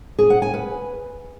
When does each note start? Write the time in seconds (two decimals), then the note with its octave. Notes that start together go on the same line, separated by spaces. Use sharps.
0.19 G#4
0.30 F#5
0.42 G#5
0.54 B4